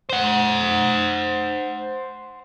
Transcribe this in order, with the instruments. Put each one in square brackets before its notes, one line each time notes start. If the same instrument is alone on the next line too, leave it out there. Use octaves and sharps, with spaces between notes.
[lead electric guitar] C5 F#5